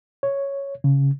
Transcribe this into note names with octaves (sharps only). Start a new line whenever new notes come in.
C#5
C#3